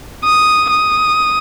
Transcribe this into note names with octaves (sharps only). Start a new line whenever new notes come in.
D#6
D#6